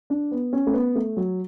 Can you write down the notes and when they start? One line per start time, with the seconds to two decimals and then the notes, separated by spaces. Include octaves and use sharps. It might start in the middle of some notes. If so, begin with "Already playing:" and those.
0.10 D4
0.31 B3
0.53 C#4
0.67 A3
0.73 B3
0.95 A3
1.17 F#3